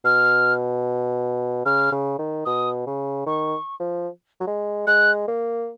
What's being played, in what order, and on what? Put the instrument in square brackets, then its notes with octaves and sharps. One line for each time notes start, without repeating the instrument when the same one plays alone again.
[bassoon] B2 [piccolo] F6
[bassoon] C#3 [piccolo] F6
[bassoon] C#3
D#3
[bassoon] B2 [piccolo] D#6
[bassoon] C#3
[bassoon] D#3 [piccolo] C#6
[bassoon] F3
F#3
G#3
[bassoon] G#3 [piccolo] F#6
[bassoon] A#3